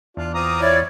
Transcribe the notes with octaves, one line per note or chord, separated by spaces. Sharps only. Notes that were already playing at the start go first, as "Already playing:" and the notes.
E2 D4 F4
C4 F4 A#5 D6 D#6
E4 C#5 D5